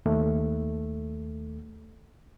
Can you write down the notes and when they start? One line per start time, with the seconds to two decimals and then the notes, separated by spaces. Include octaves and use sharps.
0.06 D#2 A3